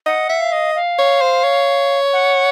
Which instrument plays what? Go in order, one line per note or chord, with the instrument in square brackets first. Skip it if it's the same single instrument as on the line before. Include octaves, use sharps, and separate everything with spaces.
[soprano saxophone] D#5 [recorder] F#5
[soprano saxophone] E5
[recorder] F5
[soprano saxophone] D#5
[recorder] F5
[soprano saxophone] C#5
C5
C#5
[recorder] F#5